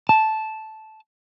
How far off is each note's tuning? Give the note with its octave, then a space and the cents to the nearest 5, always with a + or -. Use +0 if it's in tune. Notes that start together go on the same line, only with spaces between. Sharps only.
A5 -10